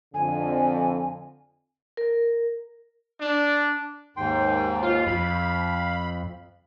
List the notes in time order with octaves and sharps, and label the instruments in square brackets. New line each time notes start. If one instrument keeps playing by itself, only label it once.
[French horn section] F2 D3 [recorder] G#5
[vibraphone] A#4
[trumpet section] D4
[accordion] D#2 G#2 [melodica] G5 C6
[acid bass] F4 [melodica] F5
[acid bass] F2 [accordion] B5